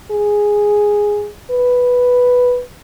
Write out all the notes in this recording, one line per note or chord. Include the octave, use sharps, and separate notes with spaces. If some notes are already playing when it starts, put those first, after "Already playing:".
G#4
B4